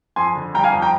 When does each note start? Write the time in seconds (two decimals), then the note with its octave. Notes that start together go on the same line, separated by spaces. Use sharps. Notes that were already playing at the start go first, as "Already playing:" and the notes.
0.16 F2 G#5 C6
0.35 D3
0.54 G3 G5 A#5
0.64 F5 G#5
0.73 F2
0.82 G5 A#5